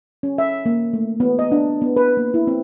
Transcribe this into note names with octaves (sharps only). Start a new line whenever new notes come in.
C#4
E5
A#3
A3
B3
D#5
D4
B3
B4
A#3
E4
C4